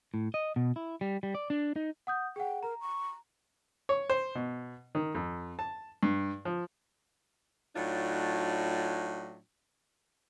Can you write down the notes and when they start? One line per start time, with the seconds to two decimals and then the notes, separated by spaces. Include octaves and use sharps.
0.14 A2
0.34 D#5
0.56 B2
0.76 E4
1.01 G3
1.23 G3
1.35 D5
1.50 D4
1.76 D#4
2.07 F#5 D#6 G6
2.36 G#4 F#5 G5
2.63 A#4 A#5
2.81 C#6
3.89 C#5
4.10 C5
4.35 B2
4.95 D#3
5.15 F2
5.59 A5
6.03 G2
6.45 F3
7.75 A2 F#3 D4 D#4 F4